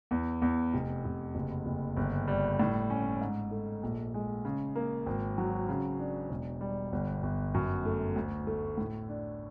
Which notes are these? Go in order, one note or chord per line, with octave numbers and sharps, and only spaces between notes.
E2
E2
F1
F1
F#1
F#1
G1
G3
A2
C#4
G#2
A3
A#1
G#3
C#3
A#3
G#1
F#3
C#3
D4
E1
G3
G1
G1
F#2
A3
D2
A3
A2
D4